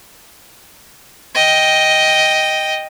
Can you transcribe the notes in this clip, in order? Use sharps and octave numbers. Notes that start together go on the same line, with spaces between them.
D#5 G5